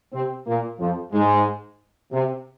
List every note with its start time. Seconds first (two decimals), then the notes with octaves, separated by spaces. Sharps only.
0.13 C3 C4
0.46 A#2 A#3
0.79 F2 F3
1.12 G#2 G#3
2.12 C3